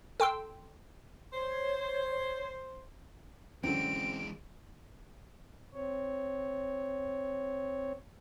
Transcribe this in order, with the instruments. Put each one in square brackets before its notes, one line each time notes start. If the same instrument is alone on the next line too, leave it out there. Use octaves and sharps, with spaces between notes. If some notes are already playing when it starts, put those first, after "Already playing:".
[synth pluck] A4 G5 C6 E6
[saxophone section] C5 [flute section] C#5
[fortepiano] F#2 D3 [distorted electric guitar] E3 G#3 [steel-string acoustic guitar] C4 [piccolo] D7
[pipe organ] C4 C#5